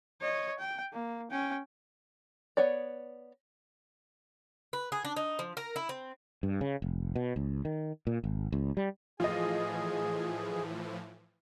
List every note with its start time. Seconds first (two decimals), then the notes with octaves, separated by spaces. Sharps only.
0.21 C#5 D#5
0.59 G5
0.93 A#3
1.31 C#4 G5
2.57 B3 C#5 D5
4.73 B4
4.92 G#4
5.05 D4
5.16 D#4
5.39 F3
5.57 A#4
5.76 E4
5.89 C4
6.43 G2
6.61 C#3
6.82 F1
7.16 B2
7.36 C#2
7.65 D#3
8.07 A#2
8.24 G#1
8.52 C#2
8.77 G3
9.20 A2 E3 F3 F4 G#4 D#5